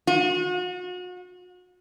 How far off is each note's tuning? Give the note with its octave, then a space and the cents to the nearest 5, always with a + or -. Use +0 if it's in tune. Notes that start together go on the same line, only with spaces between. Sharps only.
F#4 -40